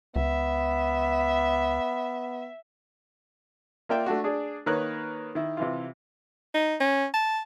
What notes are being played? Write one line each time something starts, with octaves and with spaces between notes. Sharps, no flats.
C#2 B3 E5
A#3 F4 A#4 D5 E5 G5
A3 D4 F#4
D4 G#4 D5
D#3 A#3 A#4 B4 C#5 F#6
D#3 E4
C3 E3 F4
D#4
C#4
A5